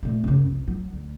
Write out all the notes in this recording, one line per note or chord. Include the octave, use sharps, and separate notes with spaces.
A#2 A3
F#2 C#3
C2
F#3
D2